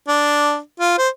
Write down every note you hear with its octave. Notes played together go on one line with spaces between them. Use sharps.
D4
F4
C5